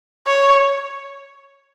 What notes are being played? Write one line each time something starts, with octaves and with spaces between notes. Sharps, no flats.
C#5